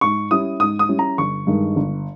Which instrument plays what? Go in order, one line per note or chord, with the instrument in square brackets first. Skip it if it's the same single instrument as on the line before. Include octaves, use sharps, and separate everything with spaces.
[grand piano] G#2 C#6
G3 C#4 E4 D#6
G#2 D#6
D#6
G3 C#4 E4
A#5
G1 C#6
G2 D#3 G#3 D#4
G1